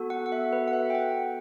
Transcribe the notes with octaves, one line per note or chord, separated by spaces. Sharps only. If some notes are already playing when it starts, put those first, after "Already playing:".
Already playing: B3 F#4 A4
F#5
F#5
E5
B4
F#5
E5
G5
F#5